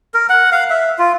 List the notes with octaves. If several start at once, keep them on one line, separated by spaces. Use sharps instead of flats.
A#4
F#5
F5
E5
F4